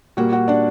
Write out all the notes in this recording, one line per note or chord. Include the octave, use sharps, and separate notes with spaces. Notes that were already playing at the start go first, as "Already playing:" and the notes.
A#2 G3 A#3 F#4 F#5
F#4 F#5
D4 D5